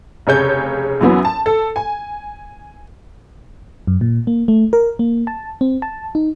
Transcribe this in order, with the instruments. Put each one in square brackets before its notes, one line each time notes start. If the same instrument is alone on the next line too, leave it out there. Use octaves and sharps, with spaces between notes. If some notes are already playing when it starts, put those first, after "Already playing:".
[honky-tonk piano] F1 C#3 C#5 G6
F#2 E3 F#3 B3
A5
A4
G#5
[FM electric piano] F#2
A#2
A#3
A3
A#4
A#3
A5
C4
A5
D#4